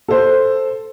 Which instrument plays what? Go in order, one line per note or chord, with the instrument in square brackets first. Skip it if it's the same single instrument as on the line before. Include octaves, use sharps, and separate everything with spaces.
[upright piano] A4 C5